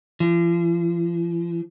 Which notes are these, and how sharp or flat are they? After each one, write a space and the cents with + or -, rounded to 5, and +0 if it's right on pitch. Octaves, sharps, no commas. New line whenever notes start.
F3 -45